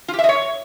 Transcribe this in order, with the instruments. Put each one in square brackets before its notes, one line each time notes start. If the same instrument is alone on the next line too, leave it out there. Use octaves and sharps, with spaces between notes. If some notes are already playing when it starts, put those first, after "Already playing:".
[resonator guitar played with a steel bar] F4
G4
E5
D#5
C#5